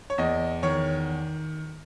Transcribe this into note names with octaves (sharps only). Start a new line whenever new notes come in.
C#5
E2 D#5
D#3 C#5